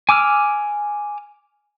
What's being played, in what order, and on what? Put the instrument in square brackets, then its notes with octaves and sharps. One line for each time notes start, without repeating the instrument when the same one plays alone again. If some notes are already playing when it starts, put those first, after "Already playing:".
[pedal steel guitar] G#5 D6 E6 F6